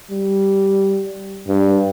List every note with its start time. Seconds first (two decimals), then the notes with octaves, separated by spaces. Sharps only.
0.10 G3
1.48 G2